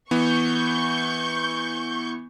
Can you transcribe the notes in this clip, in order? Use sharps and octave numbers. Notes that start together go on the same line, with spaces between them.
E3 B3 C#6 G6